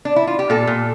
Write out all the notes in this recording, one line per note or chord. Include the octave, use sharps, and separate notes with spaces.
D4
E4
F4
G4
A#2 A4
A#2